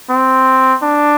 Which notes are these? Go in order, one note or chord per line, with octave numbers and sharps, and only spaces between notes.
C4
D4